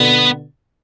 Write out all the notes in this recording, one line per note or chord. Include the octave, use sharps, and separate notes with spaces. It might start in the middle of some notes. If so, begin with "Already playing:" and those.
Already playing: B2 D3 B3